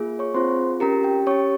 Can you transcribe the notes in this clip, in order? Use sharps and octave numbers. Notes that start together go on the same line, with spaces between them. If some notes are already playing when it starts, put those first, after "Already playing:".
Already playing: A#3 F4 G#4
C#5 C#6
C4 F4 G#4 C5 C6
C#4 G4 A#4 A#5
G4 G5
C#4 G4 C#5 C#6